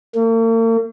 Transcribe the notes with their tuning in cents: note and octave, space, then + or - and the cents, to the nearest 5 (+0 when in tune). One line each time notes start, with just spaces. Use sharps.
A#3 -45